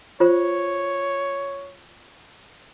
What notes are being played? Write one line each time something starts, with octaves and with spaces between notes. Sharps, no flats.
F4 C5 C#5